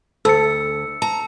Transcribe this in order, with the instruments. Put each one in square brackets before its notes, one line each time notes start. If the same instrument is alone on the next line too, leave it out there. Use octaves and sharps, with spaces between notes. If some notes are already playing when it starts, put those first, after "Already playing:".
[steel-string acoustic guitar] D2 [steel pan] A4 [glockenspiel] E6 C#7
[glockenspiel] A5 [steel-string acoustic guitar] A#5